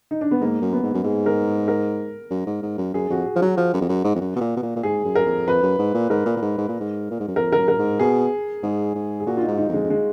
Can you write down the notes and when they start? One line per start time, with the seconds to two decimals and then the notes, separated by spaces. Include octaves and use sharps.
0.11 D#4
0.21 D4
0.31 B3
0.41 G#2 A#3
0.62 F#2
0.73 B3
0.83 G#2
0.95 F#2
1.04 G#2 G#4
1.26 A#4
1.68 A#4
2.31 F#2
2.47 G#2
2.63 G#2
2.78 F#2
2.94 F#2 G#4
3.10 F2 F#4
3.26 G#4
3.36 F3
3.41 F#3 F#4
3.57 F3
3.74 F#2
3.81 F2
3.89 F#2
4.05 G#2
4.15 F2
4.21 F#2
4.36 B2
4.41 A#2
4.57 B2
4.63 A#2
4.76 A#2
4.83 G#2 G#4
5.05 F#2
5.16 F#2 A#4
5.26 F2
5.47 F2 B4
5.63 F#2
5.79 G#2
5.94 A#2
6.10 G#2 A#4
6.26 A#2
6.37 A#2
6.42 G#2
6.58 G#2
6.69 A#2
6.80 G#2
7.11 A#2
7.20 G#2
7.28 F#2
7.36 F2 A#4
7.52 A#4
7.58 F#2
7.68 A#4
7.79 G#2
7.99 B2 G#4
8.63 G#2
8.95 G#2
9.20 G#4
9.27 A#2 F#4
9.37 F4
9.42 D#4
9.48 G#2
9.58 D#4
9.69 F2 G#3
9.84 F2
9.90 G#3